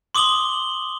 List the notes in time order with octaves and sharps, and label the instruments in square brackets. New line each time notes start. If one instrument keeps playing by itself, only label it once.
[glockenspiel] C6 D6 D#6 F#7 G7